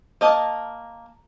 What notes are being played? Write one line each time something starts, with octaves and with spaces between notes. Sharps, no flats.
A#3 D#5 A5